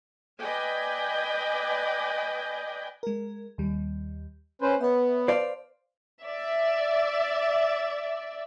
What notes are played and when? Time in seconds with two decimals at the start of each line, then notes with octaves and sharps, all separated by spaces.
0.40 B4 D5 D#5 G5 G#5
3.03 G#3 A#4
3.58 D#2 G3
4.62 C#4 B4 C5 G6
4.81 B3 C#5 E5
5.28 B4 C5 D5 F5 A5 C6
6.22 D5 E5